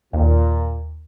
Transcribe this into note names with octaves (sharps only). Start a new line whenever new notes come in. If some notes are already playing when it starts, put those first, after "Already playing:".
D#2 A#2